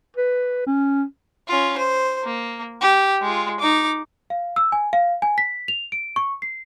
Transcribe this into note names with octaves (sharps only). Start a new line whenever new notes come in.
B4
C#4
C#4 F4
C5
A#3
G4
G#3 F4
D#4 D6
F5
E6
G#5
F5
G#5
B6
F7
D7
C#6
C7